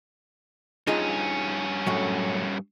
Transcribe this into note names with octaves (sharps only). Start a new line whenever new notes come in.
G2 C#4 D#4 F4 G#4
F#2 A2 F#3